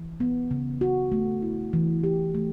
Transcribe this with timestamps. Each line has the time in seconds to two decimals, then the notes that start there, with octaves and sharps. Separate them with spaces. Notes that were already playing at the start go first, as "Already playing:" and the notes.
Already playing: E3
0.20 B3
0.51 C#3
0.81 F#4
1.12 A3
1.42 E4
1.73 E3
2.03 G4
2.35 A3